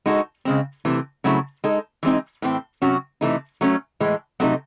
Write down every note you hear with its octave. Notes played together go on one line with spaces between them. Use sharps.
G#3 D#4 F#4 A4
C#3 G#3 C4
C3 E3 A3
C#3 F#3 A3 C4 E4
G#3 D#4 A4
E3 G#3 C4 D#4
A2 E3 C4
C3 F#3 C#4 F#4
C3 E3 A3 D#4
F#3 A3 C#4
A2 E3 G#3
C3 F#3 A3 D#4